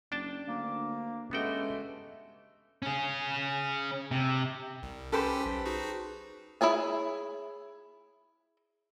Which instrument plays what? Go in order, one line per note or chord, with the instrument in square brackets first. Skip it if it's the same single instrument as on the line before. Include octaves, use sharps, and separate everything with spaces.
[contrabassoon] F#1 [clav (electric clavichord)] D4 G5 A5
[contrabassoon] D2 [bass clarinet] A#3
[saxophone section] G2 E3 A3 [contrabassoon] C#3 [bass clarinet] G#3 [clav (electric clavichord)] B3 F#4 G5
[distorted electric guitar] C#4 G#4
C3
[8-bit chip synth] C2
[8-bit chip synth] C#4 G4 G5 [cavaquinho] A4 B4 C5
[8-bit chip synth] B1
D#4 F#4 G#4
[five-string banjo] E4 G#4 C#5 G#5